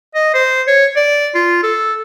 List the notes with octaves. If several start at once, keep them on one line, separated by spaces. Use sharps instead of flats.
D#5
C5
C#5
D5
F4
A4